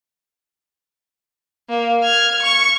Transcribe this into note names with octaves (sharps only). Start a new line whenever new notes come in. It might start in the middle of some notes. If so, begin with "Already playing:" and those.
A#3
F6 G#6
C#6